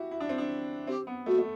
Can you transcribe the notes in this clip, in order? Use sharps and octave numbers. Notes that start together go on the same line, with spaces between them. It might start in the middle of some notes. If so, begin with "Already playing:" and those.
Already playing: E4 F#4 G4
E4
D4
C4
D4
C4 G4
B3
A3 F#4
A3